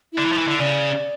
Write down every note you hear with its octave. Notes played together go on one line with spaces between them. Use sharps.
E4
D3
E3
F3
E3
D3
C#3 D5